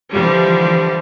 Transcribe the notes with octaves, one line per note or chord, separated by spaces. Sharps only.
D3 E3 F3 G3